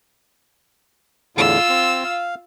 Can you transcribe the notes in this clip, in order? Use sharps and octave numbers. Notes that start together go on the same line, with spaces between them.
E2 A2 D3 F4 E6
C4
F5